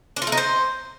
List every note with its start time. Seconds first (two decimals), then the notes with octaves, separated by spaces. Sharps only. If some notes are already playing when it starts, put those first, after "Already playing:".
0.16 D4
0.22 F4
0.27 A3
0.32 D#4
0.38 C5